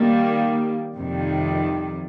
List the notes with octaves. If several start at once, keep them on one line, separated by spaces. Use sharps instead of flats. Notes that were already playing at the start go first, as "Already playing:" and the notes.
Already playing: D#3 G3 A#3
F2 C3 D#3 G3